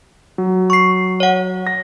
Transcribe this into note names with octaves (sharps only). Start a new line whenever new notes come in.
F#3
C#6 C7
C#5 F#5
A#6